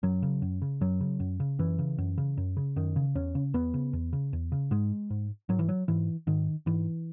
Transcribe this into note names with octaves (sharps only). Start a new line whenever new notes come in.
F#2 F#3
C#3
F#2
C#3
F#2 F#3
C#3
F#2
C#3
F#2 E3
C#3
F#2
C#3
F#2
C#3
F#2 D#3
C#3
E2 C#4
C#3
E2 B3
C#3
E2
C#3
E2
C#3
G#2 G#3
G#2
G#2 F#3
E3
F#3
G#2 E3
G#2 D#3
G#2 E3